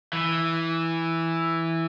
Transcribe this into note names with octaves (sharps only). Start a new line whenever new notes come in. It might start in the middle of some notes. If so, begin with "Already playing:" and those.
E3